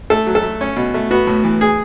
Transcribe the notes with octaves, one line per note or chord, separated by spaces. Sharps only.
A3 A4
F#3
A4
A3
C#4
B2
A3
B3 F#4
A2
E3
G#4